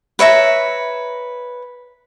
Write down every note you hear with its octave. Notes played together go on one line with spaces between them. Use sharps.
B4 C#5 E5 A#5